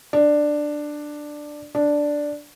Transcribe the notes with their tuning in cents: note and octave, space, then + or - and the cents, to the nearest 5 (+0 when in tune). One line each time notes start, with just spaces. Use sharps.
D4 +10
D4 +0